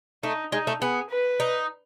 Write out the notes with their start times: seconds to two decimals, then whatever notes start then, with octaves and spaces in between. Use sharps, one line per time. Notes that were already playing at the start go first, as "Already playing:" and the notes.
0.23 A3 D#4
0.52 G#3 D#4
0.67 A3
0.81 B3 G#4
1.10 B4
1.40 D#4